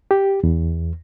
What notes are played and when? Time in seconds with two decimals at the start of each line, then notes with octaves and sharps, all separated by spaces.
0.11 G4
0.44 E2